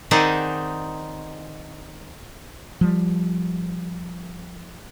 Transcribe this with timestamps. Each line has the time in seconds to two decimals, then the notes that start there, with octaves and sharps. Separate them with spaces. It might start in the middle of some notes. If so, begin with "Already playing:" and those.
0.11 D#3 C4 D#4 G#4 D5 F#5
2.81 F3 G3